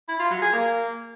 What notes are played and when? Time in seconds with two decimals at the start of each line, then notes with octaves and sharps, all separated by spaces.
0.08 E4
0.19 F4
0.31 F#3
0.42 G#4
0.53 A#3